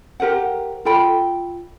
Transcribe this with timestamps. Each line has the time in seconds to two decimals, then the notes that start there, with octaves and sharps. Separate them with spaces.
0.20 G4 A#4 C5 F#5
0.85 F4 A4 G5 B5